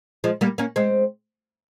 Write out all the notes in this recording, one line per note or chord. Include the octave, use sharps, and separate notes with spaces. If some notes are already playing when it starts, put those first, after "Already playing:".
F3 G#3
G3 A#3
A#3 C#4
G#3 C4